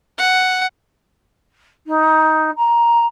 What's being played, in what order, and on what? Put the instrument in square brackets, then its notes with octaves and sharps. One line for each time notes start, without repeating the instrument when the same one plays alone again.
[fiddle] F#5
[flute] D#4
A#5